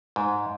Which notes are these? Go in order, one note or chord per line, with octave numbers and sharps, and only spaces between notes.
G#2